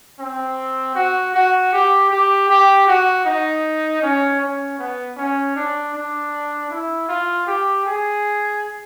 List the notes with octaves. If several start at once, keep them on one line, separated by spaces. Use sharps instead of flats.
C4
F#4
F#4
G4
G4
G4
F#4
D#4
C#4
C#4
B3
C#4
D4
D4
E4
F4
G4
G#4